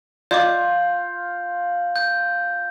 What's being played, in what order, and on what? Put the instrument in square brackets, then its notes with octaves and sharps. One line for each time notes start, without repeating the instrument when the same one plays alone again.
[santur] F4 [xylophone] D5 D#5 D6 [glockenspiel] G6
[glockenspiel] G6